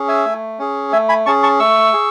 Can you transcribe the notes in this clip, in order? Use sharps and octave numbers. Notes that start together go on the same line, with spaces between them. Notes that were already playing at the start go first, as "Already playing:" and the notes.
Already playing: C#4 G#4
E5 G#5
A3
C#4 G#4
A3 E5 G#5
G#5 B5
C#4 G#4 A5 C#6
A5 C#6
A3 C#6 E6
G#4